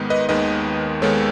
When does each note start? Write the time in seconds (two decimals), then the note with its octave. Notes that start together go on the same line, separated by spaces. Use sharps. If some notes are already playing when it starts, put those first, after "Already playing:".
Already playing: G#2 D#3 G#3 B3
0.10 B4 D#5
0.29 D#2 D#3 G#3 B3 B4 D#5
1.02 D#2 D#3 G#3 B3 A4 C#5